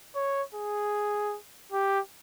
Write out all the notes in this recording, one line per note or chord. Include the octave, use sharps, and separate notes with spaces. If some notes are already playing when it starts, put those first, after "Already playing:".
C#5
G#4
G4